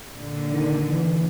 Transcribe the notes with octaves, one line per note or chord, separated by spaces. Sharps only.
A#2 D3
D#3
E3